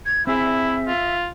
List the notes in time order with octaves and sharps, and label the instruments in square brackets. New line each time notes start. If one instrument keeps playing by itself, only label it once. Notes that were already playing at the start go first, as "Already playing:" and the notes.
[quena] G#6
[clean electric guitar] C4 G#4 [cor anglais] E4 [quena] E5
[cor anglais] F4